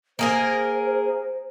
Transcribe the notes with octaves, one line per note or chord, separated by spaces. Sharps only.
A#3 G#4 A#4 C5